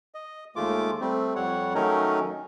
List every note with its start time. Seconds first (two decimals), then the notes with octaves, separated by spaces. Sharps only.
0.14 D#5
0.56 D#2 G#3 A3 F4 D6
1.01 G3 A3 C4
1.36 F2 G3 C#5 F#5
1.75 D#3 F#3 A3 C#4 D#4 A#4